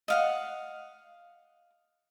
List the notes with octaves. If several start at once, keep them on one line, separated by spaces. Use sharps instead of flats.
D#5 F5 F#5